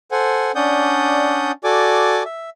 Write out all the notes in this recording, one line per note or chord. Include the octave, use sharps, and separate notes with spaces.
A4 C5 F#5 G#5
C#4 D4 D5 F#5 D#6 G6
F#4 A4 D5 G#5 D6
E5